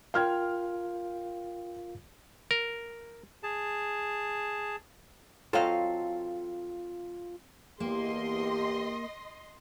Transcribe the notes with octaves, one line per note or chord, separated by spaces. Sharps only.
F4 A#4 F5 G5 F6 G#6
A#4
G#4 A5
F#3 C4 F4 A4 D#5 F5
E2 A#3 G4 D#5 C6